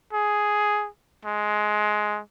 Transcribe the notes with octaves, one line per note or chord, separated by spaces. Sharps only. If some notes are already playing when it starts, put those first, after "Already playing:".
G#4
G#3